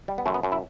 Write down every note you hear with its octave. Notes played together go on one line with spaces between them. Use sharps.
G3
B3
F#2 A3
B3
F#2
E4